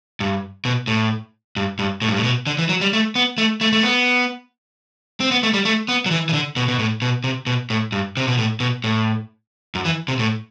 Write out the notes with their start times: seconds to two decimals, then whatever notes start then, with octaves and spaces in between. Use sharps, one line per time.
0.20 G2
0.65 B2
0.87 A2
1.56 G2
1.79 G2
2.02 A2
2.09 G2
2.17 A2
2.24 B2
2.47 D3
2.58 E3
2.69 F#3
2.81 G3
2.93 A3
3.15 B3
3.38 A3
3.61 A3
3.73 A3
3.83 B3
5.20 C4
5.31 B3
5.43 A3
5.53 G3
5.65 A3
5.88 B3
6.06 F#3
6.11 E3
6.29 E3
6.33 D3
6.56 B2
6.68 B2
6.79 A2
7.02 B2
7.24 C3
7.47 B2
7.70 A2
7.92 G2
8.17 C3
8.28 B2
8.38 A2
8.60 B2
8.84 A2
9.75 F#2
9.85 E3
10.08 C3
10.19 A2